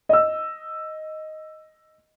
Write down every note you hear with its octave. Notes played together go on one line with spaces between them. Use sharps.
D#5 E6